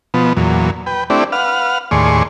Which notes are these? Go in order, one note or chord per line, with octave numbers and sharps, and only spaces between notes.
B2 F3 B3
E2 A#2 F#3
B4 G5
A3 C4 D4 E4 G4 D5
B4 F5 F#5 F6
D#2 A2 G#4 D5 C6 C#6